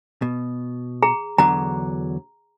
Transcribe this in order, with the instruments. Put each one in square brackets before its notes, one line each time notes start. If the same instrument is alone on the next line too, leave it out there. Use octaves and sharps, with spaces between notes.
[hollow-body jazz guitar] B2
[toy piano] G#4 A#5
[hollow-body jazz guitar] E2 D3 F#3 [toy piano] A#5